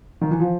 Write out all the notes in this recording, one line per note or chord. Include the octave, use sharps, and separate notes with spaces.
D#3
E3
F3